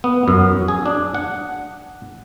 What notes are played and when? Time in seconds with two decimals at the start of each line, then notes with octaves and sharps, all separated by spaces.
0.04 B3
0.28 F#2
0.68 G#4
0.86 D4
1.14 F#5